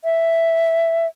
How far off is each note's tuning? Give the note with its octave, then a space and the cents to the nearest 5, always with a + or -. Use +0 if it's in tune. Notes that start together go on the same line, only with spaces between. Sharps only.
E5 +5